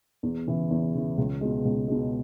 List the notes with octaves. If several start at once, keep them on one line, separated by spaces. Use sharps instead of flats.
E2
C#3 E3
E2
C#3 E3
C#2
B2 G#3
C#2
B2 G#3